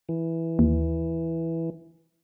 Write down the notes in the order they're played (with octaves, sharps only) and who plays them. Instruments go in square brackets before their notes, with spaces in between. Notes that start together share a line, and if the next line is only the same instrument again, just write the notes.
[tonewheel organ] E3
[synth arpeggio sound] D#2